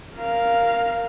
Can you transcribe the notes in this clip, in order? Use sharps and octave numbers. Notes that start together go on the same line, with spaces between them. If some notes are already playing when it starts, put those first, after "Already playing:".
A#4 F5